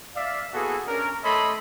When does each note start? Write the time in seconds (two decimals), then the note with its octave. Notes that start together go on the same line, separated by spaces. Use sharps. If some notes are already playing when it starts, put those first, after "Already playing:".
0.15 D5 E5 F5
0.53 A#3 B3 E4 F#4 G#4 A4
0.87 C#4 D4 A#4
1.24 A3 A4 C#5 D#5 B5 C6